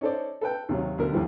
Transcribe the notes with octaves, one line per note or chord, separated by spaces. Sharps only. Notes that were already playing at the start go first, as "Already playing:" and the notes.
C#4 D#4 A4 C5 D5
A4 B4 G5
D#2 C3 F#3
D2 B2 A#4
D#2 A2 F3 G3